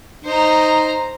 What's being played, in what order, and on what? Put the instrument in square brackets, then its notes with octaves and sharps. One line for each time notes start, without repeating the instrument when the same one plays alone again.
[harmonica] D#4 [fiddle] C5 A#5